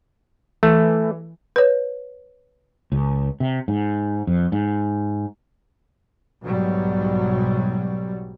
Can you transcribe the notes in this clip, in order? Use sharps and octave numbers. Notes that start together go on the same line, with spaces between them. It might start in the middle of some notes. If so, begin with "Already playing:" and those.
E3 A3
B4 C#5
C#2
C3
G#2
F2
G#2
B1 G#2 B2 F#3 G3